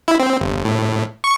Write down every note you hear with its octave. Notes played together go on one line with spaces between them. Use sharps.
E4
C4
G1
A2
C#6